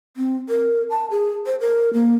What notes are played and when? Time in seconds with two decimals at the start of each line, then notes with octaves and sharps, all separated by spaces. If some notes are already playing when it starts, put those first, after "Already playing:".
0.17 C4
0.49 A#4
0.90 A5
1.11 G#4
1.46 C5
1.61 A#4
1.93 A#3